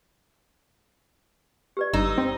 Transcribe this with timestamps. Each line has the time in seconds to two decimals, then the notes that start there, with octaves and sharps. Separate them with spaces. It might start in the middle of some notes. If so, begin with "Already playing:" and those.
1.77 G4 B4 D5
1.93 G1 D#4 E6
2.18 C4